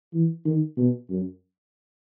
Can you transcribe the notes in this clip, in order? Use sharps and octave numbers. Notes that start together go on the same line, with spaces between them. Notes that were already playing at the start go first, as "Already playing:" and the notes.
E3
D#3
B2
F#2